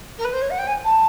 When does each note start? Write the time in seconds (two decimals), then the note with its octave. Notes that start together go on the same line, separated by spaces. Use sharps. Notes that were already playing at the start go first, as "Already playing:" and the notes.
0.18 A#4
0.24 B4
0.33 C5
0.41 C#5
0.50 F#5
0.58 G5
0.67 G#5
0.84 A5